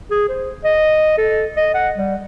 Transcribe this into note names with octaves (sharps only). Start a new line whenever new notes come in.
G#4
C5
D#5
A4
D#5
F#5
G3